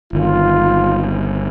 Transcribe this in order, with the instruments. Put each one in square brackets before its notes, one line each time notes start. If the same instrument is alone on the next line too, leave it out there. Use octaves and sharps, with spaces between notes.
[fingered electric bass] G1 D#3 [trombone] F4